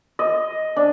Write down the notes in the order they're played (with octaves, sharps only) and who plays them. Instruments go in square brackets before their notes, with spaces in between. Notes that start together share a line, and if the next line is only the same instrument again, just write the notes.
[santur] D#5
D4